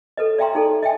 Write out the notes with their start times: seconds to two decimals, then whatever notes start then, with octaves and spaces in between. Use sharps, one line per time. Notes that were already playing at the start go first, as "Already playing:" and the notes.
0.17 A4 B4 D#5
0.38 D5 E5 F5 G5 A#5 C6
0.55 D#4 G#4 A4
0.83 D#5 E5 G5 G#5